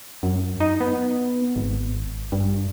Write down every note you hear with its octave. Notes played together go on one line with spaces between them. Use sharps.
F#2
D#4
B3
G#1
G2